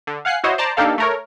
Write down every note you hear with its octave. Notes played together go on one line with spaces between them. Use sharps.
D3
F5 F#5 G#5 F#6 C7
E4 F#4 C5 C#5 D#5
C5 D5 A5 A#5
A#3 D4 D#4 G4 A4 F5
A3 A#4 C#5